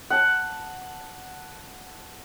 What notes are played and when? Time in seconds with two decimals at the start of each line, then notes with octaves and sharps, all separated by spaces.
0.10 F#5 A5